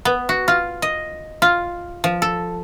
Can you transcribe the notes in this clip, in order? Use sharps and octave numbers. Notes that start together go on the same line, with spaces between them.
B3
F#4
F4
D#5
F4
F3
A4